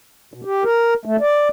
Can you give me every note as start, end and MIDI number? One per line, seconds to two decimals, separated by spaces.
0.34 0.41 47
0.45 0.64 67
0.64 0.94 70
1.05 1.16 57
1.21 1.49 74